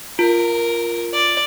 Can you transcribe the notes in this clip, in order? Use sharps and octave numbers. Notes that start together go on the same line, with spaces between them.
F4 A#4
D5